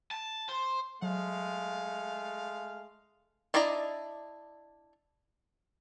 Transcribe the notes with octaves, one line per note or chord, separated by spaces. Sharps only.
A5
C5
F#3 G#3 A3 F5
D4 E4 D5 D#5 A#5